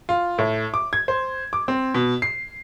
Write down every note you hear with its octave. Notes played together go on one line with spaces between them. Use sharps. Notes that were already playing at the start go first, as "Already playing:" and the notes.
F4
A2
D6
G#6
C5
D6
C4
B2
C7